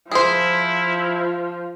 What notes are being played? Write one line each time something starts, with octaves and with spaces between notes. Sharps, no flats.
F3 E4 G#4 C5